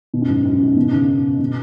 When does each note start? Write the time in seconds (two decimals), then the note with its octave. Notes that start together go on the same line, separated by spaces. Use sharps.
0.14 B2
0.22 F#2
0.29 G#2
0.45 F#2
0.61 G#2
0.77 B2
0.93 C#3
1.40 B2